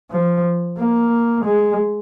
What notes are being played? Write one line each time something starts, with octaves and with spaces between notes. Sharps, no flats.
F3
A#3
G#3